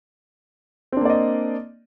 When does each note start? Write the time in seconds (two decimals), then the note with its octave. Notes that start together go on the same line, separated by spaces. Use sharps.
0.92 C4
0.97 D4
1.01 A#3
1.05 D5
1.10 D#5